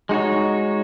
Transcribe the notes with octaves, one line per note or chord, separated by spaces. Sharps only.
G#3 D#4 F#4 C#5